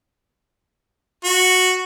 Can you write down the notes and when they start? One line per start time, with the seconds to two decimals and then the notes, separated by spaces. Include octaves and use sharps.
1.25 F#4